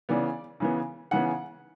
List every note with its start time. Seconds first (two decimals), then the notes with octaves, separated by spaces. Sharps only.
0.09 C#3 E3 B3 D5
0.60 C#3 E3 B3
1.11 C#3 E3 B3 F#5